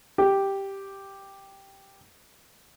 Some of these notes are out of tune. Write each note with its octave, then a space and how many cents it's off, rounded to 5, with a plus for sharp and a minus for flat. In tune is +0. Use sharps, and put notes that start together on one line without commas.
G4 +0